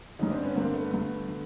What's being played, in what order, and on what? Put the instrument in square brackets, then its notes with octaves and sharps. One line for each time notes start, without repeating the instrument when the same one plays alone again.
[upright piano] G2 D3 C#4 D#4
C4 D4
B3 C#4
G2 D3 A#3 C4
A3 B3
G2 D3
D3